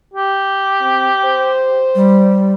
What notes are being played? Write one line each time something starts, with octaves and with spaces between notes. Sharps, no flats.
G4
C4
C5
G3